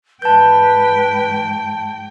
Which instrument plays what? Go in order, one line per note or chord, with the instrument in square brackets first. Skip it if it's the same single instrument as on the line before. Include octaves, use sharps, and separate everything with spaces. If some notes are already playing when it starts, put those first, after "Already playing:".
[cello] G#2 G5 [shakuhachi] B4 [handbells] A5 G6